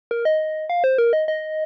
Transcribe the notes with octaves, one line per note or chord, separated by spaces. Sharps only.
A#4
D#5
F5
C5
A#4
D#5
D#5